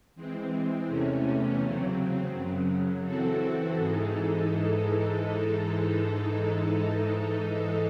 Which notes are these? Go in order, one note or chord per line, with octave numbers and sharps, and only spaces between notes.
E3 G#3 C4
E2 C3 E3 A3 C#4
C#3 F#3 C4
F#2 C#3 F#3
E3 C4 F#4 A4
G#2 E3 G#3 D#4 A4